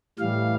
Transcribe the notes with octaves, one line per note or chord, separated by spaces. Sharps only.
A2 E3 G3 F5